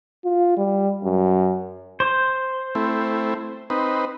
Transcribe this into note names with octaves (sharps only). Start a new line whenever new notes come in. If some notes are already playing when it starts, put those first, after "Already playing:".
F4
G3
F#2
C5
A3 C4 E4
C4 D#4 B4